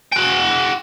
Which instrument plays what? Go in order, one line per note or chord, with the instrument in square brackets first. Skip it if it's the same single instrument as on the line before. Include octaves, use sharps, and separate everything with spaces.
[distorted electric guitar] F#4 G5